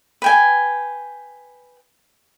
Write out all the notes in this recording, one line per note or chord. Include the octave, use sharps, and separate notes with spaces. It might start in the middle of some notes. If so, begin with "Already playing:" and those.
B4 G5 G#5